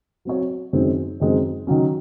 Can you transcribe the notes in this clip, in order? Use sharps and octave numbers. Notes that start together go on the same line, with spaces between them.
F#3 C4 F#4 C#5
F#2 D#3 G#3 C4
F#2 D#3 G#3 C4
D#3 F#3 C#4